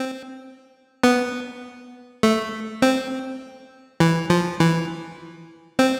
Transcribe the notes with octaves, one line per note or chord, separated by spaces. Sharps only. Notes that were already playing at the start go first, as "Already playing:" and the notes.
Already playing: C4
B3
A3
C4
E3
F3
E3
C4